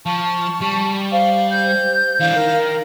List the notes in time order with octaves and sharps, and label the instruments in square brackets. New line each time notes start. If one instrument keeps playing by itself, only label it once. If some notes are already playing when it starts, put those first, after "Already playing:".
[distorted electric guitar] F3 [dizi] A5 [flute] C#6
[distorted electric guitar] G3
[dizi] C5 [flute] F5
[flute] G6
[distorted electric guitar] E3 D4 [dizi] F5
[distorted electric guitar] D#3 [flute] A#4